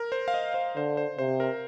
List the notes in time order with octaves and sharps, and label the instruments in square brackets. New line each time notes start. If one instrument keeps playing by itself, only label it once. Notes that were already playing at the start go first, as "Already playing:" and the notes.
Already playing: [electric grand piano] A#4
C5
F5
D#5
C5
[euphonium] D3 [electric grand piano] C5
[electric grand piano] C5
[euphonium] C3 [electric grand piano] C5
[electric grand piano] A#4